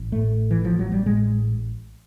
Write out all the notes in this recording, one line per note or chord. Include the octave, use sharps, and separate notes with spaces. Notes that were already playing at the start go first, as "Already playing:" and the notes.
Already playing: A1
A2 A3
E3
A1
F3
F#3
G3
A2 G#3